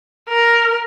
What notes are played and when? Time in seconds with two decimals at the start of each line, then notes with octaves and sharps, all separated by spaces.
0.29 A#4